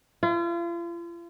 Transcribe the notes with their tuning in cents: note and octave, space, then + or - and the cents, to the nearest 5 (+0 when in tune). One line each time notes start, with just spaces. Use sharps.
F4 -40